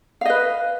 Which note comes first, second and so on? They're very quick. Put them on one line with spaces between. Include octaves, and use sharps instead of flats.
F5 D#5 B4